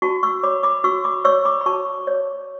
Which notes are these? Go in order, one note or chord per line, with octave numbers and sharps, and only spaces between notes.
F#4 A5 C#6
C#6 E6
C#5 B5 D6
B5 D6
F#4 C#6 E6
B5 D6
C#5 C#6 E6
B5 D6
B5
F#4 A5 C#6
C#5